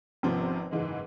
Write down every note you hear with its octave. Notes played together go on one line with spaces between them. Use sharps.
G#1 C3 F3 B3 C#4 C5
F#1 G#2 E3 G#3 D#4